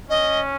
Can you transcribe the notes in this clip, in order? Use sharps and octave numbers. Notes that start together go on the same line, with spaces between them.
C#4 D#5